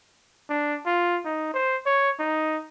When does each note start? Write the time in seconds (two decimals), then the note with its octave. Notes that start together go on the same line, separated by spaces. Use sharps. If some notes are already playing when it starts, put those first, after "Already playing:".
0.49 D4
0.86 F4
1.25 D#4
1.53 C5
1.86 C#5
2.19 D#4